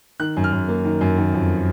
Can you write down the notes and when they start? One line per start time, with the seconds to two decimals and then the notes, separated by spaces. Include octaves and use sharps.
0.20 D#3 F#6
0.37 F#2
0.44 F6
0.52 F#2
0.68 A#3
0.85 D#3
1.01 F#2
1.17 D#3
1.34 F2